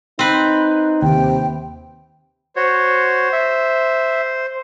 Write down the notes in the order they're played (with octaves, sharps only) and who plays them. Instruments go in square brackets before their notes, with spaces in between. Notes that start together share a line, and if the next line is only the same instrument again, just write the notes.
[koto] C4 B4 [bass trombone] D#4
[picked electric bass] D#2 [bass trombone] C3 [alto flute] G5
[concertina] F#4 C#5 [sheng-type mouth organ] C5
[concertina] E5